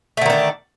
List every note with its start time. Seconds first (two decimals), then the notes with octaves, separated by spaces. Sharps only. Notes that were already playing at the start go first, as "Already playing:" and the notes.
0.17 A3
0.21 D3
0.26 D#3
0.30 D4